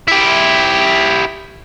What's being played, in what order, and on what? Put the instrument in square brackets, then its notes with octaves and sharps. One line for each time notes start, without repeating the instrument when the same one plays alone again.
[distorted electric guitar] E4 G4